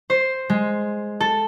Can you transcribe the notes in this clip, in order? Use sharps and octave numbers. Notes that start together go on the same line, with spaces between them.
C5
G#3
A4